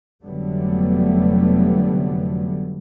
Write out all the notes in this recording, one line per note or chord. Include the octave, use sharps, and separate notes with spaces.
F1 D3 F#3 G3 A3 B3